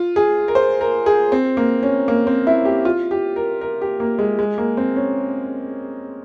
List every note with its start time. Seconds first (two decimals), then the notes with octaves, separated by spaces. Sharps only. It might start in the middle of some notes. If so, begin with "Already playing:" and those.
Already playing: F4
0.16 G#4
0.48 A#4
0.55 C5
0.81 A#4
1.06 G#4
1.32 C4
1.57 A#3
1.83 C#4
2.08 A#3
2.27 C4
2.47 E4
2.65 G4
2.85 F4
3.11 G4
3.36 A#4
3.61 A#4
3.81 G4
4.00 A#3
4.19 G#3
4.39 G#3
4.58 A#3
4.77 C4
4.96 C#4